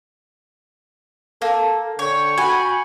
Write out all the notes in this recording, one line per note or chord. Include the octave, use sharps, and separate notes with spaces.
A#3 A4
D3 C#5 G5 C#6
F#4 G#5 B5